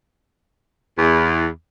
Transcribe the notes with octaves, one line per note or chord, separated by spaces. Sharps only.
E2